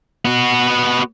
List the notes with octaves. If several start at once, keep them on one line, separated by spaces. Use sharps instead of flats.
B3 F#4